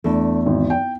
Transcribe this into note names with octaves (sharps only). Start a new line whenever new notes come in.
E2 A3 D4
G#1
G5